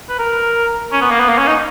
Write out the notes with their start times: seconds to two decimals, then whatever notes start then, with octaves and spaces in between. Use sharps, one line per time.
0.09 B4
0.19 A#4
0.92 C#4
1.01 B3
1.11 A#3
1.20 B3
1.28 A#3
1.38 C#4
1.47 D#4